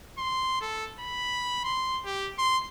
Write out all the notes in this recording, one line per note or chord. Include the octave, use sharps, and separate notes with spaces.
C6
A4
B5
C6
G4
C6